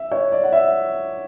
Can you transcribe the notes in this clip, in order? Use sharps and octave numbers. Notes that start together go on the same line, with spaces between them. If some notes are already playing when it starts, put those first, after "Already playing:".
Already playing: E5
C#5
D5
F#5
E5